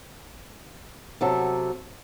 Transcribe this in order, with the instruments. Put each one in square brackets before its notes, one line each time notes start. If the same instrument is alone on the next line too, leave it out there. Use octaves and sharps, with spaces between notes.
[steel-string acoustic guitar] C3 F#3 A4